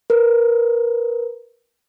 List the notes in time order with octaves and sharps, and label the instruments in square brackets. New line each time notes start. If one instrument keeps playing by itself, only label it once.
[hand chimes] A#4 B4